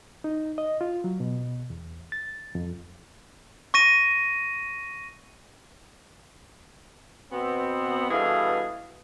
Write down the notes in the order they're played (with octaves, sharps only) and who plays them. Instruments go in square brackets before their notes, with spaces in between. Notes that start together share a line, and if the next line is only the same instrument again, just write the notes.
[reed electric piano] D#4
D#5
F4
F#3
B2
E2
A6
F2
[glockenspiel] C#6 A#6 D#7
[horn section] B2 B3 C4
G2 B2 E3 G#4 A4 F5